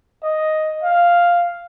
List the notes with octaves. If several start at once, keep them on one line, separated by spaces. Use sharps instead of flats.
D#5
F5